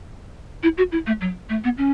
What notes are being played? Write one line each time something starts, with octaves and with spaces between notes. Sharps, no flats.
E4
F#4
E4
A3
F#3
A3
B3
C#4